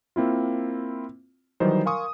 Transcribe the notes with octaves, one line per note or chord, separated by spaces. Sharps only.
A#3 C4 E4 F4
D#3 E3 F#3 G3 D#4 C5
A#4 F5 G#5 C6 C#6 D#6